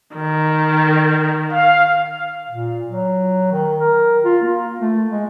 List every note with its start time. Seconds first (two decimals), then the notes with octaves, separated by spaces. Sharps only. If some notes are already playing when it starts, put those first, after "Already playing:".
0.16 D#3
1.51 F5
2.49 A#2
2.88 F#3
3.52 D#3
3.80 A#4
4.24 F4
4.42 A#3
4.81 A3
5.10 G#3